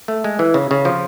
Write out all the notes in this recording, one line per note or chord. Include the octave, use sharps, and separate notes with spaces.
A3
G#3
E3
C#3
C#3
F3